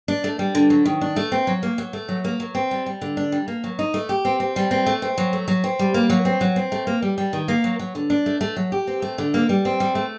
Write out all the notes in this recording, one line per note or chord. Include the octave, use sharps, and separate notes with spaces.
D4
A3
G3
D3
F#3
D#3
D4
A3
C4
F#3
A#3
F#3
A3
F#3
A#3
F#3
C4
G3
G3
D3
D4
G3
A#3
F#3
D#4
A3
G4
C4
C4
G3
C4
A3
C4
F#3
A3
F#3
C4
G3
A#3
F#3
C4
F#3
C4
A3
A#3
G3
G3
D#3
A#3
F#3
F#3
D3
D4
A3
A3
F#3
G4
C4
A3
D3
A#3
G3
C4
G3
A3